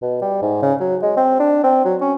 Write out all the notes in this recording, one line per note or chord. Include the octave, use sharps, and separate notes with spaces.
B2
G3
G#2
C#3
F#3
G#3
C4
D4
C4
F#3
C#4